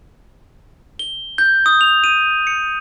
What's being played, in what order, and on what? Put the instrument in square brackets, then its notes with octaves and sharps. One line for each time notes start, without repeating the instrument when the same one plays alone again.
[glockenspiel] G7
G6
D#6
F7
D#7
C#7